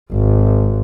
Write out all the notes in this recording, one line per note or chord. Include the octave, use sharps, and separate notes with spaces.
G#1